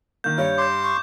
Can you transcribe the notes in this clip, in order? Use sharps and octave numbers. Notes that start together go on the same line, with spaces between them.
D#3 A#3 G6
G2 C#5
C6 D6 G6
C#6